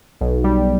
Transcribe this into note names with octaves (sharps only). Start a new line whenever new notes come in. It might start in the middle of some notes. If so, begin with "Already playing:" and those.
B1
G3